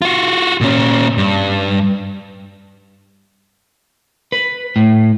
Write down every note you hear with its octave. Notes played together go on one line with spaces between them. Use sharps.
F4 F#4
A#2 C#4
G2
B4
A2